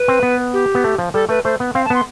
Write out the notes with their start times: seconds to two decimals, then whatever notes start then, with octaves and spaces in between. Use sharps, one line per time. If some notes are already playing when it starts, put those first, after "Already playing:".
Already playing: B4
0.08 C4
0.23 B3
0.53 G4
0.75 B3
0.84 A3
0.98 F3
1.14 G3 A4
1.29 A3 B4
1.44 A3 C5
1.60 B3
1.75 C4 F5
1.85 A5
1.90 B3 C6